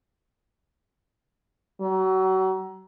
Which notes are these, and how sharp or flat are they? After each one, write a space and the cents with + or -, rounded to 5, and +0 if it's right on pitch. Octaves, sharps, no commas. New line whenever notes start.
F#3 +30